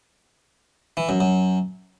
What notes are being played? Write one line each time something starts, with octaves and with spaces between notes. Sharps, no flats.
E3
F#2
F#2